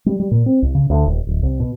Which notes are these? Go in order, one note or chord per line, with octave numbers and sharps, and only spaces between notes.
G3
G3
A#2
C4
C2
C#3
D2
D#1
D1
C2
B2